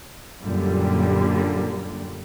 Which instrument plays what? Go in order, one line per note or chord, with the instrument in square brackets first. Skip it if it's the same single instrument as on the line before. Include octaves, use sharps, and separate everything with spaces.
[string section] F#2 A#2 D3 G3